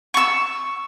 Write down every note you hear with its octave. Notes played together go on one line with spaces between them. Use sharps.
C#6 E6